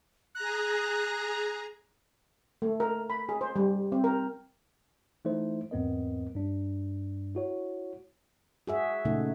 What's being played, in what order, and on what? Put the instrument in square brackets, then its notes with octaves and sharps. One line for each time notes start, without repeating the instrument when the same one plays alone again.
[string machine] G#4 A#5 [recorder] F#6
[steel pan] A3
A#4
B5
G#4
C5
G3
C4
A#4
[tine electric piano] E3 A3 D#4 E4 C5
E2 G#2 B3 C4 A#4 D#5
G2 D4
E4 F#4 C#5
[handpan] F#4 G#4 E5
A#2 C#3 A3 D#4